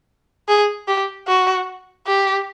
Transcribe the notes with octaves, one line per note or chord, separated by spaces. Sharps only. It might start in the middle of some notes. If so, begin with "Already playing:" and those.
G#4
G4
F#4
G4